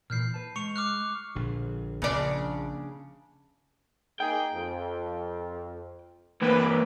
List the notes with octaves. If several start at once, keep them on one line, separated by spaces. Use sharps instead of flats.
A#2 E3 F6 G6 C7
B4 A5
G#3 C#6 C#7 F7
D6 F6 F#6
A#1 D3
A#1 C#3 D4
A#3 D#4 G#4 G5
F2
E3 A#3 B4